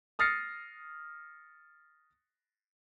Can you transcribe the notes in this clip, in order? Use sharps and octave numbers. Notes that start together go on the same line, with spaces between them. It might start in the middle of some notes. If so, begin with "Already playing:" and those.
D#6 F6 A6 A#6 C7 C#7